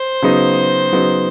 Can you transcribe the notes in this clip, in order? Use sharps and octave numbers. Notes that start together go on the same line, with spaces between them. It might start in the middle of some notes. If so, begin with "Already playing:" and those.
Already playing: C5
C#3 F#3 B3 D#4
C#3 F#3 B3 D#4